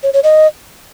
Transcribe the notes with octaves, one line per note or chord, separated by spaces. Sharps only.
C#5
C#5
D#5